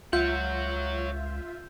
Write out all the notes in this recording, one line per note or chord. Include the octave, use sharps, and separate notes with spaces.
C#2 F4 C#5 E5 F#5 G6